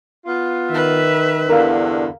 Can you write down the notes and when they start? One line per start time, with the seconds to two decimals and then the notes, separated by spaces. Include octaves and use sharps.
0.26 B3 F4
0.71 D#3 B4 E5
1.49 E2 G2 D3 A#4 F5